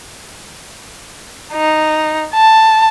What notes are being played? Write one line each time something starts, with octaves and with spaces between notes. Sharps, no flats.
D#4
A5